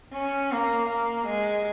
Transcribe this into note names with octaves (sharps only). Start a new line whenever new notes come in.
C#4
A#3
A#3
G#3